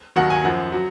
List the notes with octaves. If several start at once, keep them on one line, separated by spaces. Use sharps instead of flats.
D#2 D#3 F#3 F#5
G#5
F#2 F3 F#5
F#3